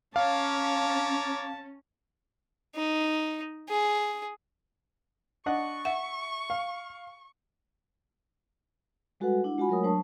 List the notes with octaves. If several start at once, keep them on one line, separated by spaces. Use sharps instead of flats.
C#4 C#5 F5 A5 A#5 D6
D#4
G#4
D4 D#5 F#5 C#6
E5 F#5
F5
G3 G#3 F#4 A4 B4 F#5
D4 E4 F#5
G#3 F4 F#4 F#5 G#5 B5
F#3 G#3 A3 A#4 C#5 D#6
F#3 D4 C5 A5 C#6